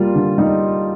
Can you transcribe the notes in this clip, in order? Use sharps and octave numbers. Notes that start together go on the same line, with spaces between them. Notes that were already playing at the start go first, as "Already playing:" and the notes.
Already playing: G3 A#3 F4
D3
G3 D#4